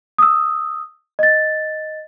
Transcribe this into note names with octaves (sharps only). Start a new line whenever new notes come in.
D#6 E6
D#5 A6